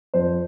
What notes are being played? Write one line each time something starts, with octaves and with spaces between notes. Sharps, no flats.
F2 C5